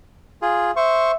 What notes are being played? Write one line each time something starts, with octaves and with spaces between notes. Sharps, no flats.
F4 G#4
C5 E5 C#6